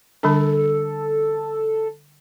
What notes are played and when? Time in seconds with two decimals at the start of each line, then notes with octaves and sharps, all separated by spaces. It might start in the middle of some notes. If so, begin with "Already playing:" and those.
0.23 D3 G3 D4 A4